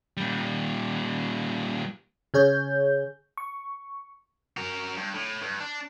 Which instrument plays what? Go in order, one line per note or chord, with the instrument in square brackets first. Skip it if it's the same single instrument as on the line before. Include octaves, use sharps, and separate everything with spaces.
[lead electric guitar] A#2 G3
[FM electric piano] C#3 G#4 C#5 G6
C#6
[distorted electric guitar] F#4 A#4
G2
A2
G2
D4